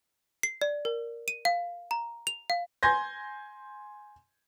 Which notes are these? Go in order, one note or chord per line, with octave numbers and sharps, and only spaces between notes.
C7
D5
A#4
D#7
F5
A#5
F7
F5
G#5 C6 G6 G#6 A#6